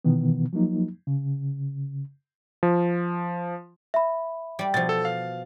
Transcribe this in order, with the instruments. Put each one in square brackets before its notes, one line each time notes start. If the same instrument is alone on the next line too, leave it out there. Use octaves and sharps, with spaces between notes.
[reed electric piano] B2 D#3 E3 B3
F3 F#3 A#3 D#4
C#3
[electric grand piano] F3
[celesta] E5 B5
[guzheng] G3 D5
[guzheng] B2 F3 [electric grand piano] A6
[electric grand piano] A4
F5